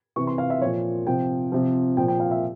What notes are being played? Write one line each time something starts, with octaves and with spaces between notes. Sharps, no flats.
C3 E3 C#6
C6
F5
E5
A#2 F3 C#5
C3 F3 G5
C3 F3
A#2 F3 G5
G5
F5
E5